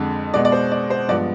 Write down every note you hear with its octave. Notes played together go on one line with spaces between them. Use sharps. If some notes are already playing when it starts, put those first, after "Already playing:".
Already playing: F2 D3 G#3
B2 G#3 B3 D5
D5
C5
D5
C5
G2 F3 G#3 B3 D5